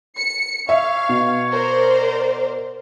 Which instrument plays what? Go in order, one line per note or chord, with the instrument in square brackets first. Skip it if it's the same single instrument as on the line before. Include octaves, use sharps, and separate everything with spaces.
[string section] C#7
[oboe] C#5 [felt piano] E5 [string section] F5
[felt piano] B2
[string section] A#4 C5 D5